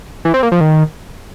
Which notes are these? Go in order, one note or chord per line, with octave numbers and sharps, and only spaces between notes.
E3
C4
A#3
F3
D#3